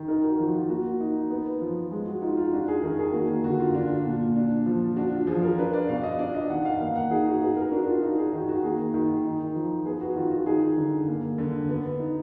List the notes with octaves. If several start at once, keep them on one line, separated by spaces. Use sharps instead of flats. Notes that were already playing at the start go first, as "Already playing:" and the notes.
Already playing: D#3
D#4 A#4
F#4
F3 F#4
F4
A#3 F#4
D#4
B3
F3
G#3
F#4
D#4 F4
F4
D4 F#4
G#4
D#3 A#4
G#4
A#3 F#4
D3 F#4
F4
D4 F4
A#2
D4
F3
D4 F#4
F4
F3 G#4
A#4
D4 B4
D5
B2 F5
D#5
D4 D5
D#5
D#3 F#5
F5
A#3 F5
F#5
D#4 G#4
F#4
B3 G#4
A#4
D4 F#4
F4
D#4 F#4
G#4
D#3 F#4
F#4
A#3 G#4
D#3
D#4
F3
B3 G#4
F#4
D#3 F4
F#4
D#4 G#4
D3
A#3
D3
B3
D#4